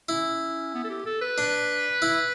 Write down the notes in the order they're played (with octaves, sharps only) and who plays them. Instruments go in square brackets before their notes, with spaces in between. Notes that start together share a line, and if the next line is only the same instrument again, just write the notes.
[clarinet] C#4 [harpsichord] E4
[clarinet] B3
A4
G4
A4
B4
[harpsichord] D4
E4